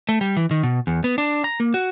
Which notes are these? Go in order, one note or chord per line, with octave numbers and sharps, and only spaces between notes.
A3
G3
E3
D#3
B2
E2
B3
D4
A#5
A#3
F#4